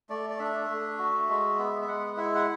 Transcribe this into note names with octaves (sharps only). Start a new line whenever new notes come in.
A3 D5
D5
D4 E5
A3
F#4
G#3
B3
E5
G#3 F#5
E4 E5
F#5